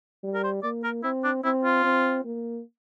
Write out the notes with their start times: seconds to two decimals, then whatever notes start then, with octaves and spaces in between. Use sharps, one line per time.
0.24 G3
0.34 A#4
0.44 C5
0.63 A#3 D5
0.84 A#4
1.03 C4 E4
1.24 D4
1.44 C4 E4
1.64 F4
1.84 C4
2.24 A#3